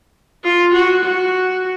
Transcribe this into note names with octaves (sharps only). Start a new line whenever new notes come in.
F4
F#4
F#4